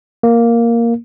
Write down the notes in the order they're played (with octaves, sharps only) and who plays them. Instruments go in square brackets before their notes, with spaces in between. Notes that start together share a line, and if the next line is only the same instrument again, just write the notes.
[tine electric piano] A#3